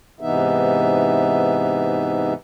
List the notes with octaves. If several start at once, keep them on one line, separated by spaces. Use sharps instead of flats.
G#2 C3 E3 B3 D#4 E5